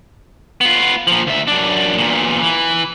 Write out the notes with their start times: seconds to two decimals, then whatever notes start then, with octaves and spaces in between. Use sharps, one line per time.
0.61 B3 F4
1.07 A#2 F3
1.27 D2 E5
1.47 F#2 D4
1.98 E2 A#2
2.42 E3